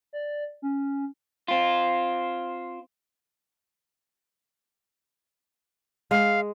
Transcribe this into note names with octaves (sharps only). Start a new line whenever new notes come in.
D5
C#4
C4 F4
G#3 F5